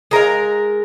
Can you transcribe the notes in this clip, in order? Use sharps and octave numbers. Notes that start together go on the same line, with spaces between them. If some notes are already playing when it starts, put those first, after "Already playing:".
G#3 A#4 C#5 F5